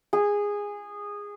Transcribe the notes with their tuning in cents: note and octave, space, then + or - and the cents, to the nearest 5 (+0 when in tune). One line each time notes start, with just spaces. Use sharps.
G#4 -15